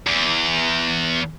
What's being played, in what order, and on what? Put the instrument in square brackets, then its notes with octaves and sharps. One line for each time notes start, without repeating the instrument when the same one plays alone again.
[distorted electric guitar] E2